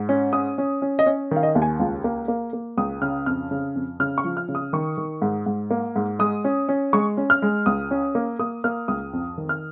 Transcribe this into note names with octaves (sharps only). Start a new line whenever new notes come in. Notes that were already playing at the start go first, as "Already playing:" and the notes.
Already playing: G#2
C#4
C#4 D#6
C#4
C#4
D#5
C#4 C#5
D#3 F5
D#5
D#2
G#5
C#2 F4
A#3
A#3
A#3
C#2 D#6
C#3 F6
F2 F6
C#3
F2
C#3 F6
C#6
F3
F6
C#3
D#6
D#3 C#6
D#3
G#2
G#2
A#3
G#2
G#3 D#6
C#4
C#4
G#3 C#6
C#4
F6
G#3
C#2 D#6
C#4
A#3
A#3 D#6
A#3 F6
C#2 D#6
F2
D#3
F6